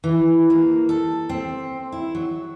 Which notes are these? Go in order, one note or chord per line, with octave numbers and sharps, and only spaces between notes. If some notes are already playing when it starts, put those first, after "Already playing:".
E3
A#3
A4
C4
E4
F#3